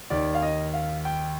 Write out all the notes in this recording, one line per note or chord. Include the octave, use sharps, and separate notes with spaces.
D#2 D#3 D5
F5
D#5
F5
G5